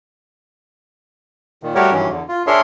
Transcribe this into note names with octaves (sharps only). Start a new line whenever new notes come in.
A#2 D#3
G3 A3 F#4 G4 A#4 C#5
G2 D#3 E3 F#3 C#4
E2 D3
F4
D4 G#4 A#4 C#5 E5 C6